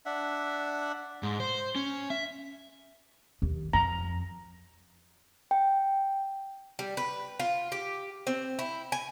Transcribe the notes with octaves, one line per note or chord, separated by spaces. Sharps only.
D4 E5 F#5
G#2
C5
C#4
E5
D#2
F2 A#5
G5
G3
B4
F4
G4
C4
E4
G#5